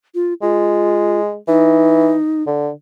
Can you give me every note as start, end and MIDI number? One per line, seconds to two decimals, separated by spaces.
0.15 0.34 65
0.42 1.37 56
0.42 1.19 65
1.48 2.15 52
1.48 2.43 63
2.47 2.70 50